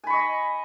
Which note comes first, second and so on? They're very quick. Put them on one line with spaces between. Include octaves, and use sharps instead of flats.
G#5 B5 C#6 D#5